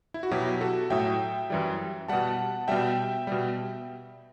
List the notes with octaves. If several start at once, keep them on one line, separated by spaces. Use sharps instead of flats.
E4
F#4
B2 F#3 E4 G4
F#4 A4
A2 F#3 E5 G5
F#2 E3 G3
B2 G3 F#5 A5
B2 G3 E5 G5
B2 G3